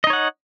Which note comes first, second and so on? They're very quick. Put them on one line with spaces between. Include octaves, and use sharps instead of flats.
D#5 D#4 C#5 F#5